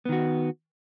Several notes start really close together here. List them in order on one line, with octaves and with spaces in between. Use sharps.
B3 D#3 F#4